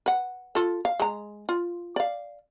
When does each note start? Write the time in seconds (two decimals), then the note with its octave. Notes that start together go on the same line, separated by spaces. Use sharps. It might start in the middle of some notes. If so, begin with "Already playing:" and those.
0.06 B4 F#5
0.55 F4 A4
0.85 F5
1.00 G#3 A#5
1.49 F4
1.96 D5 F5